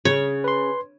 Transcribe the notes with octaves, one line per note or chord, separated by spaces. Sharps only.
C#3 C#5
B4 C6